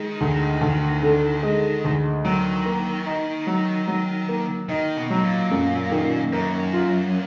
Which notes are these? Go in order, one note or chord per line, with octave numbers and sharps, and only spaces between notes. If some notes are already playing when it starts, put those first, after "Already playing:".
Already playing: D#3 G#3
D2
D2
D3
G#3
D2
D#3 F#3
A#3
D#4
F#3
F#3
A#3
D#3 D#4
B2
F#3
A#2
F#2
D#3
F#2 A#3
F4